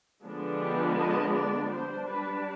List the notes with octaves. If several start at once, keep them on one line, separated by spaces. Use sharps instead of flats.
D3 F3 G#3 B3 D4
G4
D#5
D5
G3 D4 C5
B4